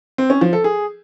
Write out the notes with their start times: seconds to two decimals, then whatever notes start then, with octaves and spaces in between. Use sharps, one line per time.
0.18 C4
0.30 C#4
0.41 F3
0.53 A4
0.64 G#4